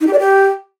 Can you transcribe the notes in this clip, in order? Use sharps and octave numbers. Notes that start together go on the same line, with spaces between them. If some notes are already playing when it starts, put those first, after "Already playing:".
D#4
G4
D5
G4